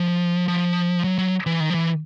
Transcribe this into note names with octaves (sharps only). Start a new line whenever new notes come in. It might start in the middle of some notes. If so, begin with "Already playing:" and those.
Already playing: F3
F3
F#3
F#3
E3
D#3
F3
E3